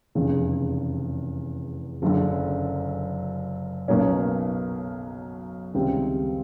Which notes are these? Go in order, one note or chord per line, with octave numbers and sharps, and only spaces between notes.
F1 E2 C#3
F#1 F#2 D3
B1 B2 F#3 A#3 C#4
C#2 C3 D#3 G3 C4